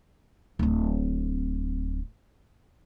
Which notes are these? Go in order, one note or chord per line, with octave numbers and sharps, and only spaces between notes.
D1 C4